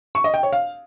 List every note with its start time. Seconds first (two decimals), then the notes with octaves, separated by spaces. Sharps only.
0.15 C#6
0.24 D#5
0.34 G5
0.43 C#5
0.53 F5